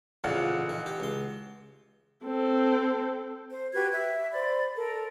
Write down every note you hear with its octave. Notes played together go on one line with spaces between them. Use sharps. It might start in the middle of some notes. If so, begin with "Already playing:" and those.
A1 F2 A#2 C#3 F5 F#5
D#3
G4
C#2 C6
C4 A4
C5
F#4 G4 B4 G#6
E5
C5 D5 B5
A4 A#4